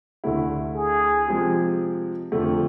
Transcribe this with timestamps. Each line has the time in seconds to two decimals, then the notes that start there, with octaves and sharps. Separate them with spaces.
0.24 D2 D3 A3 E4
0.76 G#4
1.28 C3 F3 G#3
2.32 F2 D3 F3 A3